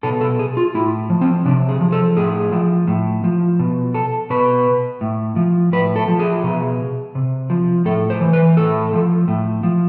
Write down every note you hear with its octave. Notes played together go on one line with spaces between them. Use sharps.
B2 A4
A4
G#4
F4
A2 E4
F3
C4
C3 D4
G#4
F3
A4
A2 G#4
F3
A2
F3
B2
A4
B2 B4
A2
F3
A2 B4
A4
F3
G#4
B2
C3
F3
A2 A4
C5
E3
B4
A2 A4
F3
A2
F3